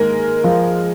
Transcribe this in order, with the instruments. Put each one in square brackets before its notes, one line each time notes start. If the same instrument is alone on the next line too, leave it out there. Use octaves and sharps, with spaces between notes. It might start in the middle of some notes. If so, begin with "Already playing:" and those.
Already playing: [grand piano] D#3 A#3 [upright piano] G#3 A#4
[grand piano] F3 G#3 F4